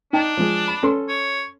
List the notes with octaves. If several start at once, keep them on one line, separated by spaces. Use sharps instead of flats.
D4 D#4 G5 A5
F3 G#3
B5
C#4 A4 C6
C#5